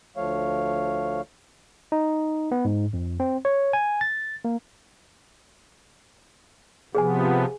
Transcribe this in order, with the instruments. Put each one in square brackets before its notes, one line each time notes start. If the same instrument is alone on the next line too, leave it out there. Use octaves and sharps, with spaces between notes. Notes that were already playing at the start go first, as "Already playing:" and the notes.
[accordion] D2 F3 A3 C#5 F5
[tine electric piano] D#4
B3
G#2
F2
C4
C#5
G#5
A6
A#3
[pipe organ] C3 F3 B3 [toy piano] G#4 B4 G#5